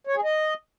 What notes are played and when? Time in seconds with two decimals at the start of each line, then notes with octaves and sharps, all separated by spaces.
0.07 C#5
0.15 G#4
0.24 D#5